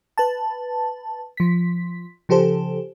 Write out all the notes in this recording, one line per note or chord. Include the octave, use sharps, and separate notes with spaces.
B4 A5
F3 B6
C#3 F3 G4 A4 C5